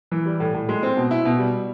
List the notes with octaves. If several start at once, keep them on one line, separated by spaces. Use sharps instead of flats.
E3
G3
A2
A2
G#3
C4
B2
E4
B2
G3